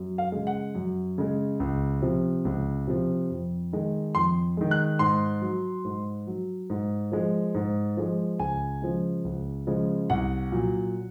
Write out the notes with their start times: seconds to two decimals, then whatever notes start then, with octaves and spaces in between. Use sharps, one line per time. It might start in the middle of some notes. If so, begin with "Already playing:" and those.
Already playing: F#2
0.18 F5
0.32 C#3 G#3
0.47 F#5
0.75 F#2
1.18 C#3 G#3
1.60 C#2
2.02 C3 F3
2.45 C#2
2.87 C3 F3
3.30 F2
3.73 D#3 G#3
4.15 F2 C6
4.57 D#3 G#3
4.71 F#6
4.99 G#2 C6
5.42 F#3
5.85 G#2
6.27 F#3
6.70 G#2
7.12 F3 G#3
7.55 G#2
7.97 F3 G#3
8.39 C#2 G#5
8.82 C#3 F3 G#3
9.25 C#2
9.67 C#3 F3 G#3
10.10 C2 F#5
10.52 A#2 F#3